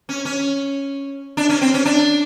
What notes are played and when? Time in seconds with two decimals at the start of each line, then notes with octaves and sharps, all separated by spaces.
0.09 C#4
0.25 C#4
1.37 D4
1.49 C#4
1.61 C4
1.74 C#4
1.85 D4